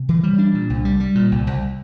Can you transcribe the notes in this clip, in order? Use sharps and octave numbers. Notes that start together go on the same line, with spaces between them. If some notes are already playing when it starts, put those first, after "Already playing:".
Already playing: C3
E3
G3
D4
A#2
C2
G3
G3
A#2
C2
C2